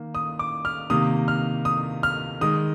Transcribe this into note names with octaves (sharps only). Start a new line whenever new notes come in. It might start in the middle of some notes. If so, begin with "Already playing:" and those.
Already playing: D#3 A#3
D#6
D6
F6
C3 D#3 A#3 D#6
F6
D#6
F6
D#3 G#3 D#6